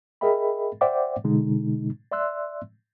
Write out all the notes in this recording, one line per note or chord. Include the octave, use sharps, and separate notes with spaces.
G#4 A#4 D#5 E5 G5 B5
C5 D5 E5 F#5 G5 D6
B2 D3 G#3 D#4
D5 E5 C6 E6 F#6